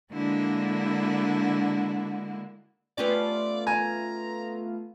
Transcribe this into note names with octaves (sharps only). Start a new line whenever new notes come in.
D3 G#3 A#3 D4 E4 F#4
A3 B3 C#4 F4 G4 B4 D5
G#5 A#5